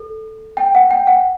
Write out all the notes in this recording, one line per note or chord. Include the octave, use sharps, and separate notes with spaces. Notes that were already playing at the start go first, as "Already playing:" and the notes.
Already playing: A4
G5
F#5
G5
F#5